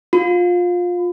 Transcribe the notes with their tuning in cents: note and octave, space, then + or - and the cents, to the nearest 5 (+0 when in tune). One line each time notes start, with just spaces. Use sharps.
F4 +20